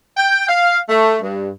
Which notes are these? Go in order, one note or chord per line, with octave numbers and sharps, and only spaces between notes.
G5
F5
A3
G2